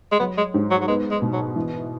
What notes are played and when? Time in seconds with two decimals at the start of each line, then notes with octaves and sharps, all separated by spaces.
0.12 G#3
0.19 F#3 B3
0.38 G#3
0.54 G#2
0.71 F#3
0.81 F#3
0.88 G#3 B3
1.11 G#3
1.22 B2
1.33 F#3
1.56 E3